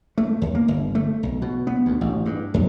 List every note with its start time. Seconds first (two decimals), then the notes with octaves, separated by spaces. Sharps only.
0.18 A3
0.42 D#2
0.55 A#3
0.68 G1
0.95 A3
1.23 B1
1.42 B2
1.67 B3
1.86 D2
2.01 A1
2.26 G2
2.54 F2